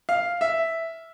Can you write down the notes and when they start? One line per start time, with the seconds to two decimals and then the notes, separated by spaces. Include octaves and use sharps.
0.09 F5
0.41 E5